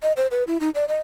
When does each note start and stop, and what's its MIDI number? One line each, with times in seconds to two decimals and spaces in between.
0.03 0.13 75
0.17 0.27 72
0.31 0.44 71
0.47 0.58 64
0.60 0.70 63
0.75 0.85 74
0.88 0.99 75